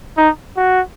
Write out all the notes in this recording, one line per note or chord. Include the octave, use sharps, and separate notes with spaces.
D#4
F#4